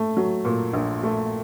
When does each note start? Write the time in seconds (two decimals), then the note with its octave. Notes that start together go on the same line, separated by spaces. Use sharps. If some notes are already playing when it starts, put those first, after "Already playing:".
Already playing: A3
0.17 F#3
0.45 A#2
0.73 A#1
1.03 A3